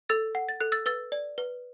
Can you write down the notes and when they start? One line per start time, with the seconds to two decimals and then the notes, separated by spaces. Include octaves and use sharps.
0.09 A4 E6 A6
0.35 F#5
0.49 A6
0.60 A4 F#6
0.72 E6 A6
0.86 B4 E6 A6
1.12 D5
1.38 B4